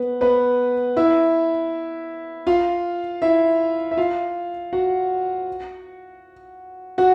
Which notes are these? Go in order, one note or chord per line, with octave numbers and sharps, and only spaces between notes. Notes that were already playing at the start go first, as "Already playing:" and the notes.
Already playing: B3 B4
B3 B4
E4 E5
F4 F5
E4 E5
E5
F4 F5
F#4 F#5
F#4 F#5